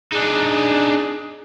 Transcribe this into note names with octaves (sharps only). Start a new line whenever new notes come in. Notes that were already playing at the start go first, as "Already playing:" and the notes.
D4 D#4 G#4